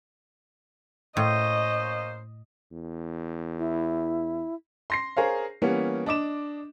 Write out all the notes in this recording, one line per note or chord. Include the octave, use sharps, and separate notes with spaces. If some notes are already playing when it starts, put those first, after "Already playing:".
A2 A#3 C#4 C5 D#5
E2
E4
C6 A#6 C7
G#4 A#4 C5 C#5 F5
E3 G3 A#3 B3 C#4
D4 D#5 D6 E7